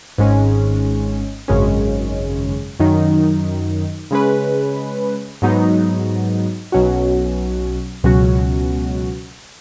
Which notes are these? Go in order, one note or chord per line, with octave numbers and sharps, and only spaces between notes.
G#1 G#2 G#3 C#4
G#1 F#2 C#3 G#3 C#4
F#2 D#3 F#3 D#4
C#3 G#3 C#4 B4
G#2 F#3 B3 D#4
B1 B2 F#3 C#4 F#4
C#2 B2 F#3 C#4 F#4